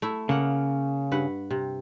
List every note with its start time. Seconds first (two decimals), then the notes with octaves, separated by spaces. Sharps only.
0.02 A3 E4
0.29 C#3 A#3 F#5
1.12 G2 B4 F#5
1.51 C3